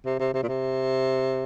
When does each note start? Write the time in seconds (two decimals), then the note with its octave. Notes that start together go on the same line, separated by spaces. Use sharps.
0.05 C3
0.19 C3
0.34 C3
0.43 A#2
0.48 C3